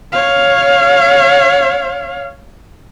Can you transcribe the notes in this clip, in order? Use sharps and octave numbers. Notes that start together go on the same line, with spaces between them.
C#5 F5